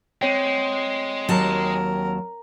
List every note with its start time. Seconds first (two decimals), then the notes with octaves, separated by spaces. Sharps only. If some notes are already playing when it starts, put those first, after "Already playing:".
0.22 G#3 C4 C#5 G5
1.29 D#2 F#3 A#4 A5